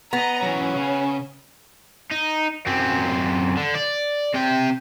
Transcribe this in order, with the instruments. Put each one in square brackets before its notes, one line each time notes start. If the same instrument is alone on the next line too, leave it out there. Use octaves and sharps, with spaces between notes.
[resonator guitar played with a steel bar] B3 [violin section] D#5 A#5
[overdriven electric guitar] E3 F#3 [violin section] C#4
[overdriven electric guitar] C#3
D#4
F#2 C4
D3
D5
C3 G5